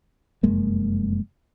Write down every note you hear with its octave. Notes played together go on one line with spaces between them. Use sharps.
F1 F#2 G#3 A#3